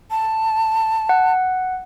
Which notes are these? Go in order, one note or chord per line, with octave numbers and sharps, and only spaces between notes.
A5
F#5